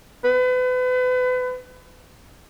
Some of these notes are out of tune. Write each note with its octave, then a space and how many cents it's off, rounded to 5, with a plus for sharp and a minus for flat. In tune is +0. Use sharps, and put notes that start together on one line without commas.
B4 +35